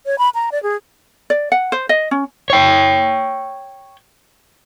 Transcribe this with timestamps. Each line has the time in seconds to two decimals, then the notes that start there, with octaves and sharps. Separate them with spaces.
0.06 C#5
0.18 B5
0.35 A#5
0.52 D5
0.63 G#4
1.30 D5
1.52 F#5
1.72 C5
1.89 D#5
2.11 C#4
2.50 C#5 G5